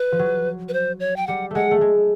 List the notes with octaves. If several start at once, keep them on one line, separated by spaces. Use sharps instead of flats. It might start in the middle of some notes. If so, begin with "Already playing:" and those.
Already playing: B4
F3
F#3
B4
C5
C#5
G5
G3 F#5
G#3 A3 F#5
A3
G#3